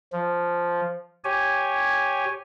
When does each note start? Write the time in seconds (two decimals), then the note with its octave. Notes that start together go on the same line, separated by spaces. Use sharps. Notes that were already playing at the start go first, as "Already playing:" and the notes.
0.12 F3
1.24 G4 C#5 G#5